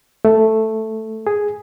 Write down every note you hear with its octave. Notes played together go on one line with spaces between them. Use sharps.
A3
G#4